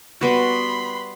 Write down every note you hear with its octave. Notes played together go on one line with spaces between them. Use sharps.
G3 B3 F#4 B5 C6